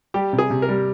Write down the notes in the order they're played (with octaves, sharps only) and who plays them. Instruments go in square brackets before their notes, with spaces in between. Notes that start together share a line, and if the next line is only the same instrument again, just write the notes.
[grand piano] G3 [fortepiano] G4
[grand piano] C3
[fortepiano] G#4
[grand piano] C3
[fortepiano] A#4
[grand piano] G3